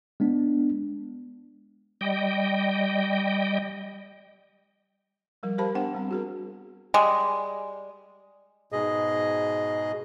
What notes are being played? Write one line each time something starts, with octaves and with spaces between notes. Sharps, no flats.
G#3 B3 D4
G3 D#5 G5
F3 G3 A#4
G4 A#4 C5 F5 A5 B5
B3 D4 C5 F#5 G5
G3 C4
F#4 G#4 A#4
G3 G#3
G#2 B2 G#4 D#5